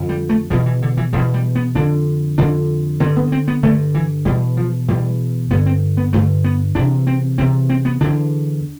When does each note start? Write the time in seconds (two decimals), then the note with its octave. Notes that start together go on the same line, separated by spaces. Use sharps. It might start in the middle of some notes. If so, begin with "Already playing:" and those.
Already playing: F2 D3
0.09 G3
0.29 A3
0.50 E2 B2 F3
0.66 E3
0.82 D3
0.97 E3
1.13 E2 B2 F3
1.34 G3
1.55 B3
1.75 F2 D3 D4
2.38 F2 D3 D4
3.00 D3 C4
3.04 G2
3.17 B3
3.32 C4
3.48 B3
3.63 G2 D3 A3
3.95 E3
4.25 E2 B2 G3
4.57 F3
4.88 E2 B2 G3
5.51 G2 B3
5.54 D3
5.66 C4
5.97 B3
6.13 G2 D3 A3
6.44 B3
6.75 E2 C3 D4
7.07 C4
7.38 E2 C3 C4
7.70 C4
7.85 B3
8.01 E2 D3 D4